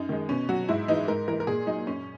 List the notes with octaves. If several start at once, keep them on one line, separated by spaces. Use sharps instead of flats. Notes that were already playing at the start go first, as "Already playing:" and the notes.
Already playing: F#2 D#4
D#3 G#3
B2 C#4
F#3 F#4
G#2 E4
E3 G#3 D#4
G#2 A#4
E3 G#3 A#4
A#4
A#2 G#4
F#3 D#4
F#2 C#4